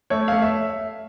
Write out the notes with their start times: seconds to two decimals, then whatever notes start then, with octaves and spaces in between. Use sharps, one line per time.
0.10 A3 C#5
0.28 A3 F5
0.42 E5